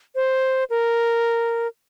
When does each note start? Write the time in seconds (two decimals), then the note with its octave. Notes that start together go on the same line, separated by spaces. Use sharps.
0.15 C5
0.70 A#4